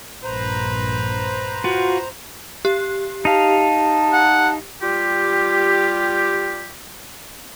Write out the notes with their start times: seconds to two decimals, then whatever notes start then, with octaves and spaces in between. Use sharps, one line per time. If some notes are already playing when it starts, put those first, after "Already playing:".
0.24 A#1 G2 B4 C5 A#5
1.64 F4 F#4
2.65 G4
3.25 D#4 F5 A5
4.12 F#5
4.82 G3 F4 G4